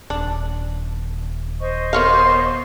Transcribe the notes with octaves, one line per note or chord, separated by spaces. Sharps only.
D#1 D4
C5 D#5 C#6
B3 A#4 C#5 F5 C6